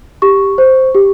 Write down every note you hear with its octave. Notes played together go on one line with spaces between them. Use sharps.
G4 C#6
C5
G4